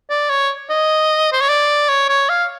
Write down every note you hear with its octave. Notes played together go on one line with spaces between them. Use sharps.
D5
C#5
D#5
C5
C#5
D5
C#5
C#5
F5